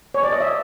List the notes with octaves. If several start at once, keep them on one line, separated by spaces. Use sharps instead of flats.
C#5
D5
D#5
E5